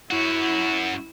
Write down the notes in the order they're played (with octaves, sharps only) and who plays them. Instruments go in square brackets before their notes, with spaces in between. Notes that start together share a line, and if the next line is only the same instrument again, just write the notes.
[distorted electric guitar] F#2 F#4 [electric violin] E4